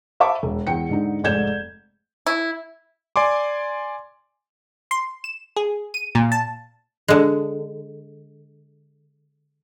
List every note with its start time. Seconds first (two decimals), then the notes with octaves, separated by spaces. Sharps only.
0.20 C5 E5 A5 B5 C#6 D6
0.43 E1
0.67 E2 G5 C#7
0.89 G#2 D3 D#4
1.24 F1 G#2 D5 G6 G#6 E7
2.26 E4
3.16 D5 G#5 C6 D6
4.91 C6
5.24 E7
5.56 G#4
5.94 D#7
6.15 A#2
6.32 A5
7.08 D3 G#3